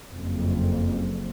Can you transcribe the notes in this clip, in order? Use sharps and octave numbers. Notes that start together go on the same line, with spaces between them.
F#1 F2